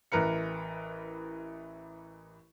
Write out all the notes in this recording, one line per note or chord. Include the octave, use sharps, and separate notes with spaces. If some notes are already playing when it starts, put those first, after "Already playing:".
A1 E3 A#4 B4 C#7